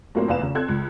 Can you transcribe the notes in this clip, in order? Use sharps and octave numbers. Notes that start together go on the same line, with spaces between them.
A2 F#3 A#3 C4 C5
F1 E2 B4 F5 E7
C#3
C4 A4 F#6 G#6
C#2